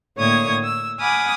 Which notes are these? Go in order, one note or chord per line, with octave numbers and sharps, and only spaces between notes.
A2 D3 A#3 C#5 D#6 G#6
E6
F#5 G#5 B5 D6 D#6 F6